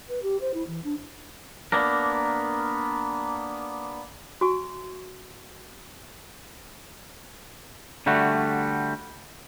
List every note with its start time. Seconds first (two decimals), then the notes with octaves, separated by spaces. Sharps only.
0.08 B4
0.22 G4
0.41 C5
0.54 E4
0.67 E3
0.84 D4
1.72 A#3 B3 D4 A#4
4.41 F#4 G#5 C#6
8.06 D3 G3 A3 F#4